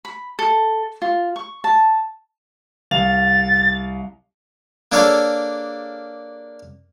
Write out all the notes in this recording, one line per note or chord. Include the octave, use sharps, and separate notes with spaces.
B5
A4
F4
C#6
A5
C2 F5 A6 F7
A#3 D4 G#4 A4 C#5 F5